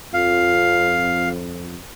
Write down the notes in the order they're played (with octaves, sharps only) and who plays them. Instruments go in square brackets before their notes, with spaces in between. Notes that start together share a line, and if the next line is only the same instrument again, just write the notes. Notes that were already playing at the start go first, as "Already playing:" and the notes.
[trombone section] F2 [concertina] F5